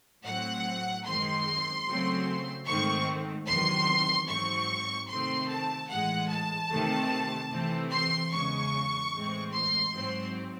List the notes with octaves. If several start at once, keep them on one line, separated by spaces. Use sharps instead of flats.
A2 F#3 C4 F#5
F#2 D#3 G#3 C4 C6
C#3 F#3 A3 C4
G#2 D#3 A3 C4 C#6
E2 C3 D#3 F#3 C6
G#2 F#3 C4 C#6
C3 D#3 A3 C4 C6
A5
A2 E3 G#3 F#5
A5
C3 D#3 A3
C3 E3 A3 C4
C6
E2 C#3 G#3 C#6
A2 E3 G#3 C4
C6
G#2 F#3 C4